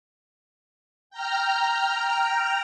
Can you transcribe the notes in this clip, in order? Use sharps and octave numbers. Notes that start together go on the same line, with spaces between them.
G5 A#5 F6